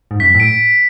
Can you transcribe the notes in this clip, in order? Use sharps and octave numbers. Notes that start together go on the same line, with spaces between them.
G#2
F#2 B6
A2 D7